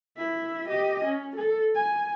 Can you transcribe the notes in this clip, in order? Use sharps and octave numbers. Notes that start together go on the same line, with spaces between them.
E4 E5
G4 D#5
C#4
A4
G#5